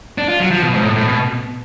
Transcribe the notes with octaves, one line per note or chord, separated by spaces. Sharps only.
D4
F4
F#3
F3
B2
G#2
A2
A2
B2